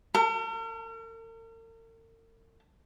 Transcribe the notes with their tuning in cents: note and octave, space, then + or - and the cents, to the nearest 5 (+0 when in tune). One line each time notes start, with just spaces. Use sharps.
A#4 -45